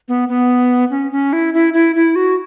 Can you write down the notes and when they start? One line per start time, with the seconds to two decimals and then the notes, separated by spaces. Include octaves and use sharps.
0.08 B3
0.29 B3
0.90 C#4
1.12 C#4
1.33 E4
1.54 E4
1.74 E4
1.96 E4
2.16 F#4